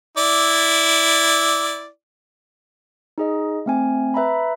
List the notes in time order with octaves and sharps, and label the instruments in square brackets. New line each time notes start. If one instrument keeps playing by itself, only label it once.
[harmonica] E4 D5
[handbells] D#4 G#4 D#5
A3 C4 G#5
B4 E5 A#5 B5